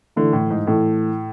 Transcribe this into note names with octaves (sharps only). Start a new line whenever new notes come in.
D3 E3 A3 E4 A4
A2
G#2
A2 E3 A3 E4 A4